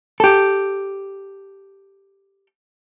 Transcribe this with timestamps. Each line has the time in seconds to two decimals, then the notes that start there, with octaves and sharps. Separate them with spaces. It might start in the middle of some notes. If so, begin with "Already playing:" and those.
0.20 G4 A4